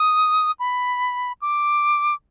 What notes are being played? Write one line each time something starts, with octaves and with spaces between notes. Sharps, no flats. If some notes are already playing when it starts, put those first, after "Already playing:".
Already playing: D#6
B5
D6